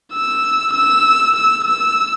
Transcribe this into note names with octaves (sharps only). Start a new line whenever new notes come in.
E6
E6
E6
E6